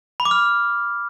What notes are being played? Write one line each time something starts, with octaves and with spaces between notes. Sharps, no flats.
B5
D6
F6